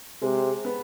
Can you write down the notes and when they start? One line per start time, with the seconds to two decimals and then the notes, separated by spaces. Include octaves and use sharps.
0.22 C3 G#3
0.65 B3